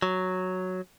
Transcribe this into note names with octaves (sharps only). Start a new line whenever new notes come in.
F#3